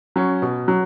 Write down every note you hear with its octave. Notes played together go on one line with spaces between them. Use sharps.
F#3 C#4
B2
F#3